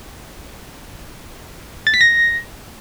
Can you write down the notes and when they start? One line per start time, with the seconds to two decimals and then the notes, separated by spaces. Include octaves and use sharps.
1.87 A6
1.94 B6
2.01 A#6